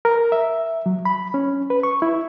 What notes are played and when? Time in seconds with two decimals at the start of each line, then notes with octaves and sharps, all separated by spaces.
0.05 A#4
0.32 E5
0.86 F#3
1.05 B5
1.34 C#4
1.70 B4
1.83 C#6
2.02 E4